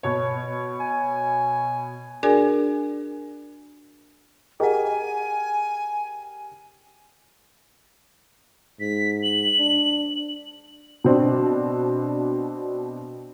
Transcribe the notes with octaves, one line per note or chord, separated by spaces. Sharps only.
B2 C#5
G#5
D4 F#4 G#4 A#4 D5 G#5
G4 G#4 A#4 D#5 F#5 G#5
G#2 B6
F#7
D4
B2 C4 D4